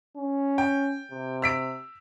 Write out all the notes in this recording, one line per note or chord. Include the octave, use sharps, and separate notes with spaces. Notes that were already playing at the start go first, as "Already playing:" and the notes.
C#4
G5
C3
E6 B6 D7